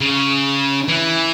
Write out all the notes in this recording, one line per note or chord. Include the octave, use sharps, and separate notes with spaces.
C#3
E3